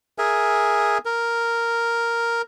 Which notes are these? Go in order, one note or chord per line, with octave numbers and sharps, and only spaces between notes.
G#4 A#4 E5 G#5
A#4